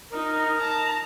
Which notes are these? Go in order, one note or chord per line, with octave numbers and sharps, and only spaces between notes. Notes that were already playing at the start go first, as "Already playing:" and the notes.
D#4 A#4
A5 A#5